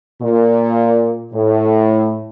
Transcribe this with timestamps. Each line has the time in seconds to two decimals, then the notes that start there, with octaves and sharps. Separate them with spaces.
0.21 A#2
1.33 A2